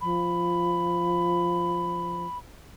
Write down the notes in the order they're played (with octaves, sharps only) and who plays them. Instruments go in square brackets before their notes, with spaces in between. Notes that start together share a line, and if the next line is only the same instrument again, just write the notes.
[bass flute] F3 [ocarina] B5